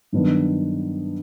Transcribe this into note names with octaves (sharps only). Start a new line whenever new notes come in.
G2 D#3 F#3 B3 D4